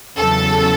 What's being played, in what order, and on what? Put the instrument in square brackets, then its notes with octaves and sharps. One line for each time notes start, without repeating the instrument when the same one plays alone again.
[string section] E2 C#3 F#3 A4